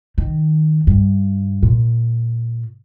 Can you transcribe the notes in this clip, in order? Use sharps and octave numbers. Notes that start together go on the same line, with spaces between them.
D#3
G2
A#2